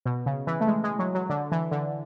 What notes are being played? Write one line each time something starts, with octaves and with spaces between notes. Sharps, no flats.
B2
C#3
E3
A3
G#3
G#3
F#3
F#3
D3
E3
D3